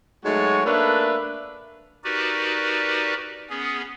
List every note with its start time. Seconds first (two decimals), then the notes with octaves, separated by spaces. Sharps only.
0.24 G#2 F#3 G#3 A3 F#4 C#5
0.65 A3 A#3 D4 A#4 B4 E5
2.04 D#4 F#4 G4 A#4 B4 D5
3.50 B3 C#4 G#4